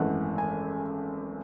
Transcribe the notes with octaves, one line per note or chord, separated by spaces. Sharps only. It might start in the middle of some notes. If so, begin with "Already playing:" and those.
Already playing: G#1 F#2 E3 A3 F#5
G#5